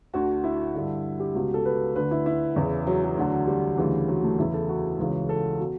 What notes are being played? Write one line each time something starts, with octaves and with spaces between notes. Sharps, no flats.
D2 D3 F#4
E4
G2 D3
G4
C#2 B2
A4
B4
D2 D3 B4
E4
E4
E2 C#3 E3
F#3
F#3
D2 D3
G3
D2 C#3 E3
F#3
A3
E2 C#3 E3 E4
A4
F#4
C#2 C#3 E3
A4
B2